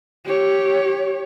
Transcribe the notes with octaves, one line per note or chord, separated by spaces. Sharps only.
G4 C#5